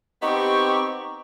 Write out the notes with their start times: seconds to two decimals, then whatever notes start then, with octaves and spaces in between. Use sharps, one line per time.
0.22 B3 C4 D#4 G4 C#6